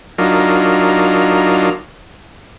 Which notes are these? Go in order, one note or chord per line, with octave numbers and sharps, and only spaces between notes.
F#3 D4 D#4 F4 A#4